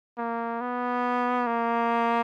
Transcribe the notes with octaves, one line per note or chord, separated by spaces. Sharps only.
A#3
B3
A#3